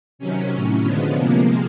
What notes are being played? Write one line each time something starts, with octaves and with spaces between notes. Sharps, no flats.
C3 D#3 F#3 C#4
A2 F#3
D3 F3 G#3 B3
C3 F3 G#3 A#3